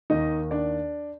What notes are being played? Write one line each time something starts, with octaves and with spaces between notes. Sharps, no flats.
D#2 D#3 D#4 D#5
D4 D5